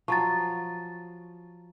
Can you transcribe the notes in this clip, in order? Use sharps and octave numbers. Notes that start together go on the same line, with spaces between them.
F3 F#3 C#6 A6